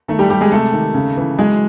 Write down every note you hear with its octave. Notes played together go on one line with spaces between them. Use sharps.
D#3 A3 A4
G3 G4
G3 G4
G#3 G#4
C3 A3 A4
D#3
C#3
E3
F#3 G#3 G#4